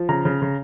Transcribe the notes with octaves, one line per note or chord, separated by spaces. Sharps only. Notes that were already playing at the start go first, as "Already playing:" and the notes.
Already playing: F3
C#3 A#5
C#3
C#3